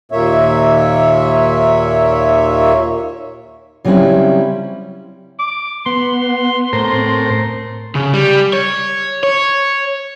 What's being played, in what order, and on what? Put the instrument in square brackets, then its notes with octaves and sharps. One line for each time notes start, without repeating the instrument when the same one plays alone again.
[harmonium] D#2 A#2 A#3 C#5 E5
[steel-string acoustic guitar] C#3 F#3 G3 C4 C#4 E4
[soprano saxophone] D6
[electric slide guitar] B3 [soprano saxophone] C6
[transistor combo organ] A2 A#4 C5
[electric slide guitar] C4
[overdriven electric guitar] C#3
G3
C#5
C#5